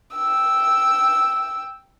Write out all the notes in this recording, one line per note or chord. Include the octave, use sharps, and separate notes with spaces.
G5 E6